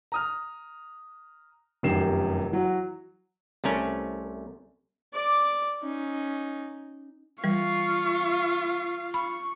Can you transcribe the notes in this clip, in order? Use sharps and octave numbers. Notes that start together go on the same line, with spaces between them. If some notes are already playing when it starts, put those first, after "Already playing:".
A#5 D#6 F6
F1 F#2 D#3 G4 C7 E7
E3 F#3 F#4
C2 C3 A3 C#4 A#4
D5 D6
C#4 D#4
E3 G3 F4 F5 C#6
B5 C#6